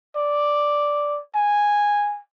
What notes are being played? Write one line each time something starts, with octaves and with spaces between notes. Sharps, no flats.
D5
G#5